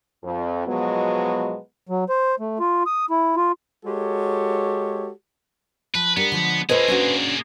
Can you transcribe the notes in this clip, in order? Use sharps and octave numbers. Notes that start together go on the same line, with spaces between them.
F2
B2 F3 F#3 G#3 B3
F#3
C5
A3
F4
D#6
E4
F4
G#3 F#4 G4 A4 C#5
F3 B4
G3 B3 D4 A#4
D3 F3 G#3
A#3 F4 G#4 A4 B4 C5 D#5
C#4 D4 F#4